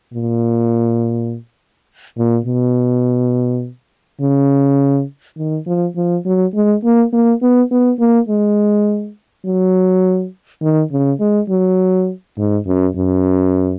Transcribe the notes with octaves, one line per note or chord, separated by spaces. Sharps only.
A#2
A#2
B2
C#3
D#3
F3
F3
F#3
G#3
A#3
A#3
B3
B3
A#3
G#3
F#3
D#3
C#3
G#3
F#3
G#2
F#2
F#2